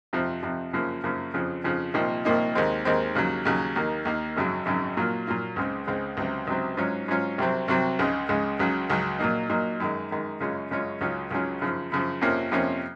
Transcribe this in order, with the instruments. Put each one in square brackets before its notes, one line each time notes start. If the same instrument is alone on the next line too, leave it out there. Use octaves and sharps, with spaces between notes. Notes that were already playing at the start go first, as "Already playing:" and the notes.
[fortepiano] F2 C3 F3
F2 C3 F3
F#2 C#3 F3 A#3
F#2 C#3 F3 A#3
F2 C#3 F3
F2 C#3 F3
C2 A#2 F3 A#3 D#4
C2 A#2 F3 A#3 D#4
D#2 D#3 G#3 C4
D#2 D#3 G#3 C4
D#2 C#3 F#3
D#2 C#3 F#3
D#2 D#3 A#3
D#2 D#3 A#3
G#1 F#2 C#3 F#3
G#1 F#2 C#3 F#3
A#2 F#3 A#3 F4
A#2 F#3 A#3 F4
C#2 C#3 G#3 C4
C#2 C#3 G#3 C4
C#2 C3 F#3 C4
C#2 C3 F#3 C4
G#2 F#3 C#4 F4
G#2 F#3 C#4 F4
C2 C3 F#3 C4
C2 C3 F#3 C4
C#2 C#3 G#3
C#2 C#3 G#3
C#2 C#3 F#3
C#2 C#3 F#3
A#2 F#3 A#3 D#4
A#2 F#3 A#3 D#4
F#2 D#3 G#3
F#2 D#3 G#3
F#2 C#3 G#3 C#4 F4
F#2 C#3 G#3 C#4 F4
C#2 C#3 F#3 C#4 F4
C#2 C#3 F#3 C#4 F4
F#2 C#3 F3
F#2 C#3 F3
F2 C3 F3 A#3 C#4
F2 C3 F3 A#3 C#4